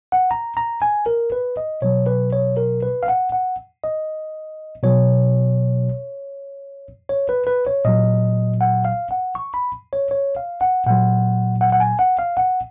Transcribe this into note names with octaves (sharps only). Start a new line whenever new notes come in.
F#5
A#5
A#5
G#5
A#4
B4
D#5
B2 F#3 C#5
B4
C#5
A#4
B4
F5
F#5
F#5
D#5
B2 F#3 C#5
C#5
B4
B4
C#5
A#2 F#3 D#5
F#5
F5
F#5
C#6
B5
C#5
C#5
F5
F#5
A#2 F#3 F#5
F#5
F#5
G#5
F#5
F5
F#5